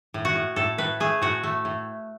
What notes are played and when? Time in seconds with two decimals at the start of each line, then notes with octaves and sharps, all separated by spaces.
0.14 A2
0.25 F#4
0.36 A2
0.56 A2 A4
0.78 A2 B4
1.00 A3 G#4
1.22 A2 F#4
1.43 A3
1.65 A2